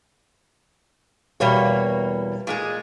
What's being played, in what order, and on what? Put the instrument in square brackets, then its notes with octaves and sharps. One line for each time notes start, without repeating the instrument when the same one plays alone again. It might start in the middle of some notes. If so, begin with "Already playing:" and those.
[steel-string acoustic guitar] E2 B2 [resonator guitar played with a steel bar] G3 A#3 C#5
[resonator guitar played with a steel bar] A#2 G#3 G#4